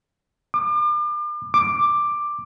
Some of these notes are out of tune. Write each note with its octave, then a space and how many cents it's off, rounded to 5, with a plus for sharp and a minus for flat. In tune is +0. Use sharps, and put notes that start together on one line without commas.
D6 +40
D6 +10